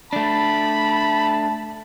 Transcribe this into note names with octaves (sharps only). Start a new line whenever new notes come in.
A3 D4 A5 B5